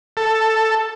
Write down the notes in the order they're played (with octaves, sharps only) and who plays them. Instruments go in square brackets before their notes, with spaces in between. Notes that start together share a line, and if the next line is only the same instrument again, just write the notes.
[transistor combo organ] A4